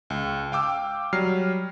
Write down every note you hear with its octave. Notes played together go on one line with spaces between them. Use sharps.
C#2
F5 G5 D6 E6
F#3 G3 F6 C7